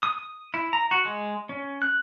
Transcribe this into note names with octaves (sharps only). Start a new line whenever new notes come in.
D#6
E4
A#5
F#4
G#3
C#4
F#6